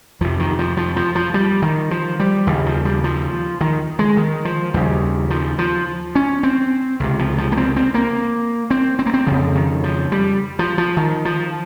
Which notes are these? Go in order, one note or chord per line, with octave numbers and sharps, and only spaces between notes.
F2 C3 F3
D#3
F3
F3
F3
F3
G3
D#3
F3
G3
D#2 C#3
F3
G3
F3
D#3
G#3
D#3
F3
D#2 C#3 G3
F3
F3
C#4
C4
C#2 C3
F3
F3
A#3
C4
C4
A#3
C4
C4
A#3
C4
F2 C#3 F3
D#3
F3
G3
F3
F3
D#3
F3